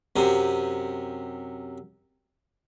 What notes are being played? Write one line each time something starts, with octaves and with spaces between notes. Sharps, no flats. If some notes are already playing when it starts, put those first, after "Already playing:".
F#2 C3